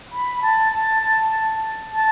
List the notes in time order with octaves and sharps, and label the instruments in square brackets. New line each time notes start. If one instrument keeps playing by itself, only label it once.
[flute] B5
A5
A5
A5
A5